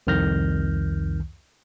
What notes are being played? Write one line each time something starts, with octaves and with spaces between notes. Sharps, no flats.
C2 F2 D#3 F6 G6 A#6